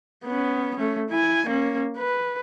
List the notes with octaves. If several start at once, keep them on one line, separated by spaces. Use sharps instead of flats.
B3 C#4
A3 C#4
E4 G#5
A#3 C#4
B4